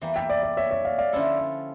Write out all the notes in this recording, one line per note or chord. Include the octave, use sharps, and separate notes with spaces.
E2 E3 G3 A#3
E5 G5
D5
D5
C#5 E5
C#5 E5
D5 F5
D5 F5
D3 F3 C#4 E4 A4